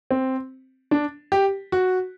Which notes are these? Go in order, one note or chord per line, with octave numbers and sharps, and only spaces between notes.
C4
D4
G4
F#4